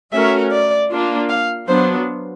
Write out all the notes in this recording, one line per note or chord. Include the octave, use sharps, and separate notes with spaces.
A3 C#4 F#4 A#4 E5
D5
A#3 D4 F4
F5
F#3 B3 D4 C5